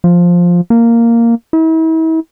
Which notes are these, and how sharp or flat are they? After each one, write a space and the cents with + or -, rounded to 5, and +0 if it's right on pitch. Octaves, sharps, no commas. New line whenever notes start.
F3 +5
A#3 -5
E4 -40